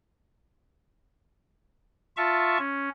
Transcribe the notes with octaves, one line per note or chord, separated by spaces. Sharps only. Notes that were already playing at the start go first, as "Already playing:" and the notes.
F4 E5 A5 C#6
C#4